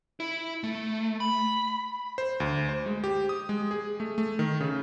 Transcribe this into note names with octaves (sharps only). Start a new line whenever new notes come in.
E4
A3
B5
C5
D2
C5
G#3
G4
D#6
G#3
G#4
A3
A3
D#3
C#3